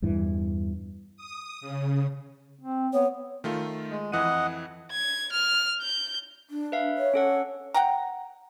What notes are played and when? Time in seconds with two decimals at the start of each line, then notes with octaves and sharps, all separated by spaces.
0.02 E2 G2 E3
1.17 D#6
1.61 C#3
2.61 C4
2.93 B3 C#5
3.44 D#3 A3 F4
3.91 G#3
4.12 F2 E3 D#5 F#5 D#7
4.92 G#6
5.32 F6
5.81 G6
6.50 D4
6.72 B4 E5 F5
6.98 C#5
7.14 C#4 A4 F#5
7.74 F#5 G5 A#5